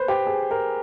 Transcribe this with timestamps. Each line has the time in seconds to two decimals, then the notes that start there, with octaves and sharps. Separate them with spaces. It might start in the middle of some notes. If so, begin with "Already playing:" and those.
Already playing: B4 C5
0.08 G4
0.27 G#4
0.51 A#4